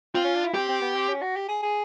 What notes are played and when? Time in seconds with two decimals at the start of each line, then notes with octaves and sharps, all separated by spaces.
0.14 C4 F4
0.24 C#4
0.35 D4
0.44 E4
0.54 C4 G4
0.69 C4
0.82 B3
0.95 C4
1.09 C#4
1.22 F#4
1.36 G4
1.48 G#4
1.63 G#4